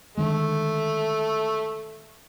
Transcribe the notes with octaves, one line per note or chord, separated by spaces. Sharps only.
D3 D#3 G#3 A3